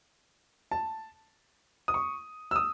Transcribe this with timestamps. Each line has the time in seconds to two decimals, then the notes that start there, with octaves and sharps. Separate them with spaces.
0.71 A5
1.88 D#6
1.94 C#6
2.51 E6
2.56 D#6